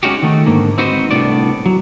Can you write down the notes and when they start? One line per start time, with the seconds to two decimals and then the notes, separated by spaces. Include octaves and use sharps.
0.03 G#3 C#4 D#4 F#4 G4
0.22 D#3 A3
0.46 G#2 D3 A#3
0.78 C4 D#4 F#4 B4 C5
1.11 C2 A2 B3 D4 D5
1.66 F#3